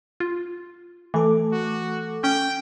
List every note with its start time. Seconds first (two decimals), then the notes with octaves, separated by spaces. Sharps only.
0.20 F4
1.14 E3 A3 A4 D6
1.52 F#4
2.24 C#4 G5